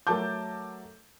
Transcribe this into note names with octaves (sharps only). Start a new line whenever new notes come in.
F#3 A3 A#4 A5 D6 G6